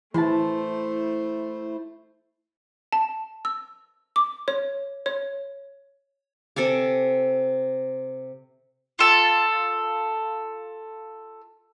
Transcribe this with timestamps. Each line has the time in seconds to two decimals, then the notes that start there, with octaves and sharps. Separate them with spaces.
0.14 E3 A3 E4 C5 A5 C6
2.93 A5
3.45 E6
4.16 D6
4.48 C#5
5.06 C#5
6.56 C3 A4 G#5 D6
8.99 F4 A4